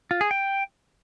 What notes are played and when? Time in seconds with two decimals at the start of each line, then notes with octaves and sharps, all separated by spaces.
0.11 F4
0.21 G#4
0.31 G5